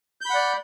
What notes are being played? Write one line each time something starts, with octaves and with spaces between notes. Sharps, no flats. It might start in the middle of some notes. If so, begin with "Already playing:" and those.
D5 F#5 B5 G6